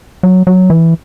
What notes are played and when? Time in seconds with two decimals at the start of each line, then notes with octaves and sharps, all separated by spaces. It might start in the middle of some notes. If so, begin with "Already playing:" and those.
0.23 F#3
0.47 F#3
0.70 E3